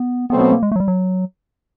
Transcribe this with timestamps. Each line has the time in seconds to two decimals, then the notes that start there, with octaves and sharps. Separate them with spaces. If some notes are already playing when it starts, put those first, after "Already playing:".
Already playing: B3
0.30 B2 F#3 A3 B3 C4
0.41 B3
0.52 A#3
0.63 G#3
0.71 A3
0.76 F#3
0.80 G3
0.88 F#3